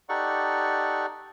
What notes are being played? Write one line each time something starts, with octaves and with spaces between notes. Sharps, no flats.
D#4 G4 A4 D5 F#5 C#6